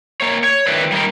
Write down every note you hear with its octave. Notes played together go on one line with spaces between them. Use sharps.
A#3 C#5
C#5
D#3 F3 A3 C4 D4 B4
G3 A#3 D#4 A#4